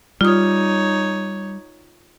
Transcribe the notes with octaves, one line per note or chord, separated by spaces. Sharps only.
G3 D#4 F4 C#5 D#6